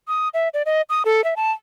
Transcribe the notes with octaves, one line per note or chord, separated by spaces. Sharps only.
D#6
E5
D5
D#5
D#6
A4
E5
A5